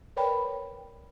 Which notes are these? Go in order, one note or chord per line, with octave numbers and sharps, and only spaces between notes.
A#4 B4 C#5 D5 G5 B5